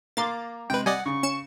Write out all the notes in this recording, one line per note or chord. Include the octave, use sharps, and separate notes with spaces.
A#3 A#5 C6 D6 A6
C3 G#3 B4 G5
G3 D5 D#5 F#5 G#5
C#3 C#6
C#4 C#7 E7